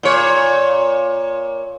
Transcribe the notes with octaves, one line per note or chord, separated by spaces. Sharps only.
A#2 C#5